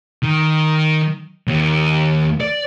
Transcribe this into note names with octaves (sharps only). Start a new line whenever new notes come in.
D#3
D#2
D5